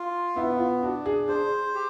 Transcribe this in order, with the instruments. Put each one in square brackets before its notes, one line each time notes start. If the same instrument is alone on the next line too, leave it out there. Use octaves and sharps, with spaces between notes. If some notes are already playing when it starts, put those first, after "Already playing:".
Already playing: [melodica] F4
[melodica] B3 [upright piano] E4
[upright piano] F4
[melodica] D4 [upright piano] F#4
[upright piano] G#4
[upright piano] G#4 [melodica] C5
[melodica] G4